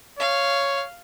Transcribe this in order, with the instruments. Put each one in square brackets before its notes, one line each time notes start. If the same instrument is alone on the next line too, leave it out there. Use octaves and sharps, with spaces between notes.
[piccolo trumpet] C#5 [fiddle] F5